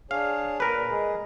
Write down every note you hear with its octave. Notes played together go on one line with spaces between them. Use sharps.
D4 G#4 C#5 F5
A#2 A#4 B4
G#3 G#4